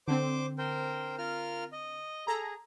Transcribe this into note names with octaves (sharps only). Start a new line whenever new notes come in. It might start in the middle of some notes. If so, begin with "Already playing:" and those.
D3 C4 C5 D6
A#4 C5 G5
F4 A#4 F6
D#5
G#4 A4 A#5